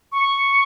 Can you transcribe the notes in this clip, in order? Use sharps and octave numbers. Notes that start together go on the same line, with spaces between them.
C#6